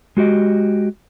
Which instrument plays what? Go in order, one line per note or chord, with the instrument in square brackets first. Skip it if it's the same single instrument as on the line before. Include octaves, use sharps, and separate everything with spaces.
[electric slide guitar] G#3 F#4 G4 D#5